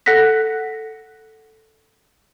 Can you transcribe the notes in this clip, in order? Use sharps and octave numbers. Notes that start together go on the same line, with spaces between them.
A4 F#5 F#6 A#6 B6